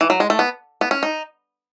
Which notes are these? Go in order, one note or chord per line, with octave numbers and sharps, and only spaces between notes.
E3
F#3
G#3
A3
B3
B3
C#4
D#4